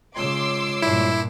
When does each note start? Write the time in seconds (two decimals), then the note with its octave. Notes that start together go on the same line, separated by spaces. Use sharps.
0.16 C#3 G#3 F4 C#5 C6 D6 E6
0.82 G2 A#2 E4